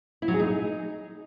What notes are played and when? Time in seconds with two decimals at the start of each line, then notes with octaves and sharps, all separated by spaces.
0.22 E4
0.28 F#3
0.34 G#4
0.40 D#4